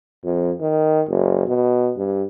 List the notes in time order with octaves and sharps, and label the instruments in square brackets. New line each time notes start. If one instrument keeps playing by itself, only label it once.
[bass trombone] F2
D#3
F#1
B2
G2